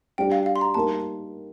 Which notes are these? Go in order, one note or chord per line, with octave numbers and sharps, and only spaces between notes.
G3 D4 G4 G5
F5
F5
C6
A#5
G3 A#3 D#4 A#4 A5